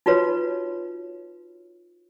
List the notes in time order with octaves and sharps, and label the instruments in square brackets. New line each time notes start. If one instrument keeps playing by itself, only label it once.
[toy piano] D#4 F4 F#4 B4 C#5